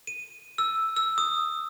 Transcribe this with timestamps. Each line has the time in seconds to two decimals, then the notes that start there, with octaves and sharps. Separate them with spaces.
0.07 D#7
0.58 E6
0.96 E6
1.18 D#6